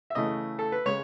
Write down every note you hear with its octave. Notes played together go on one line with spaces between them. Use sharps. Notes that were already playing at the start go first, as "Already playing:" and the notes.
E5
C#3 E3 A3 D#5
A4
B4
C#3 G#3 C#5